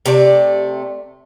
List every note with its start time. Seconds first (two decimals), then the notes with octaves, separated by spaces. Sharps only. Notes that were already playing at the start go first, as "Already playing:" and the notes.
0.06 C3 A3 D5